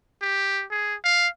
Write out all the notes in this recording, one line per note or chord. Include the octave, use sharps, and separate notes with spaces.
G4
G#4
F5